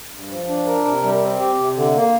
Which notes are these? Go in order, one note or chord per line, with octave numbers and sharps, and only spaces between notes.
G2
F3
D4
A#4
C3
G3
C4
G4
C3
D3
A#3